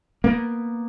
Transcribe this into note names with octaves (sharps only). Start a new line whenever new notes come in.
A#3 B3